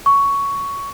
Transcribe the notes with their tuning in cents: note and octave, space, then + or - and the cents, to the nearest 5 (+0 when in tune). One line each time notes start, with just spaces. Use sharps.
C#6 +10